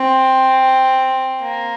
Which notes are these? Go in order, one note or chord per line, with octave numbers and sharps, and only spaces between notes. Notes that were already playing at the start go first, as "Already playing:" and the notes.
Already playing: C4
A#3